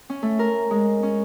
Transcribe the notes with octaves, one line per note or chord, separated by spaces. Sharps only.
C#4
A3
A#4
G#3
C#4